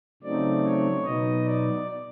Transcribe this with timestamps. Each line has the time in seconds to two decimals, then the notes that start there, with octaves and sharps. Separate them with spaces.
0.23 C#3 F#3 A3 C4 D#4 D5
0.63 C#5
1.04 B2 F#3 B3 D#4 D#5
1.45 D5